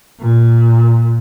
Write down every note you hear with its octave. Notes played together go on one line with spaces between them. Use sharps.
A#2